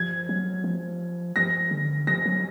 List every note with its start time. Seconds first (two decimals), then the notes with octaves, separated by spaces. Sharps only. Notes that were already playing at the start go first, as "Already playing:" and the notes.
Already playing: F3 G#6
0.29 F#3
0.64 F3
1.36 F3 A#6
1.71 D3
2.07 F3 A#6
2.26 F#3